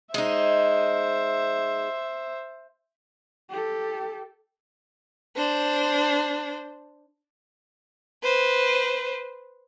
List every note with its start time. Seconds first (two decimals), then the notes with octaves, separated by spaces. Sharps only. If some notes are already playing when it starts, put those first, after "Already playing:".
0.14 G#3 D#4 C5 E5
3.50 G4 A4
5.36 D4 C5
8.24 B4 C5